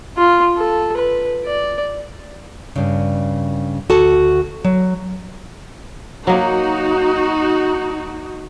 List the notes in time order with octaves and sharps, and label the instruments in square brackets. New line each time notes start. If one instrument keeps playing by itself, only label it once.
[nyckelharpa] F4
A4
B4
D5
[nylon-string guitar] G2 C#3
D2 F#4 A4 A5
F#3
[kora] F#3 A#3 [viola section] D#4 F#4